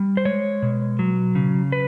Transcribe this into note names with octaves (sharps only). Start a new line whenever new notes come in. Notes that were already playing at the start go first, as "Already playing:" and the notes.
Already playing: G3
C5
G#3 C#5
B2
F#3
C#3
B4